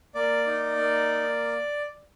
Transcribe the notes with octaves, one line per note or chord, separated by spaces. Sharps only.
A#3 D5
D#4
A#3